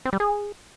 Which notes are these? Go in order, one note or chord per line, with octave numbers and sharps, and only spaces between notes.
C4
G3
G#4